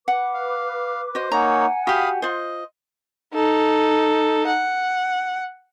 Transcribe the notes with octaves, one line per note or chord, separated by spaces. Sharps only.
B4 F#5 D6
F5
F#4 C5 D#5
A#3 D#4 C#5 F#5 G#5 A#5
F#4 G4 F5 B5 D#6
F4 C5 D#5
D#4 A4
F#5